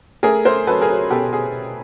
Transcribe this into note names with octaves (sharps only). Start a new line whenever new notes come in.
A3 G#4 A#4
A3 A#4 C5
F#3 A4 B4
G#4 A#4
F#3
B2 G4 A4
G#4